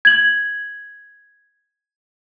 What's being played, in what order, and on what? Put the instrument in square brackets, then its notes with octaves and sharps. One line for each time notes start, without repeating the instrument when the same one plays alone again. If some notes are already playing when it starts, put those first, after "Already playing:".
[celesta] G#6 F#7